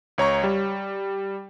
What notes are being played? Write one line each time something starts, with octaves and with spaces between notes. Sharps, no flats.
C#2 C#5 A#5 C#6
G3